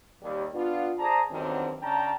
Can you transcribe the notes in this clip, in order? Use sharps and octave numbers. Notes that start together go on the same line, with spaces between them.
D#2 G3
B3 D4 F4
G#4 C5 D5 A5 A#5
E2 G2 D3 D#3 F#3 C4
C#3 C#4 D4 G5 A5 A#5